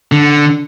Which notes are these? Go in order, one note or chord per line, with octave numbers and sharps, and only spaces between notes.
D3